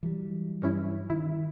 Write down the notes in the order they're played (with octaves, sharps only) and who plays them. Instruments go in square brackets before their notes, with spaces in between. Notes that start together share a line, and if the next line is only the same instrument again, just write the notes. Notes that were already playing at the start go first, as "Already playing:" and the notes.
[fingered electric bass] E3 F#3 G3
[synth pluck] G2 C#4 E4
[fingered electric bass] D#3 [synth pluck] E4